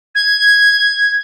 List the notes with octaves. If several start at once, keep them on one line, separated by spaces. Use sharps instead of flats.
G#6